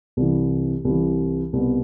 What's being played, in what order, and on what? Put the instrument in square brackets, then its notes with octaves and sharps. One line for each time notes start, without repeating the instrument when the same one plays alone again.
[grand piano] C2 C3 E3
C2 C3 E3
C2 B2 B3